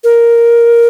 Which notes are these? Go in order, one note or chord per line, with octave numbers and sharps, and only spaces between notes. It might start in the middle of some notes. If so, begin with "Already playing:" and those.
A#4